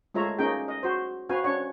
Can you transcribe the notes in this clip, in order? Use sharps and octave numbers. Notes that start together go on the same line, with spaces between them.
G#3 A3 F4 C#5 E5 A#5
A#3 C#4 D#4 G#4 G5
D#5
F#4 C5
C4 F#4 B4 F5 G#5
C#4 D4 C#5 F#5